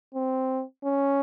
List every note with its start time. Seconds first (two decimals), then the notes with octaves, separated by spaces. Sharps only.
0.14 C4
0.84 C#4